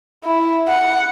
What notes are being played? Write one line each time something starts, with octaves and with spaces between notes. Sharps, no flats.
E4
F#5